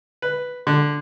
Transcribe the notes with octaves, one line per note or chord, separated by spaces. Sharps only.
B4
D3